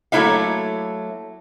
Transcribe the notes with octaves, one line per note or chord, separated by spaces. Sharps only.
F#3 A3 A#3 E4 E5 F5